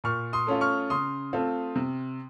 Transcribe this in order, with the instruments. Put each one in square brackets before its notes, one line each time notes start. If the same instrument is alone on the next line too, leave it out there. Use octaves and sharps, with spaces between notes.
[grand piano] A#2 C#6 F6
C6 D#6
A3 C#4 F4
C#6 F6
C#3 C6 D#6
A3 C4 F4
C3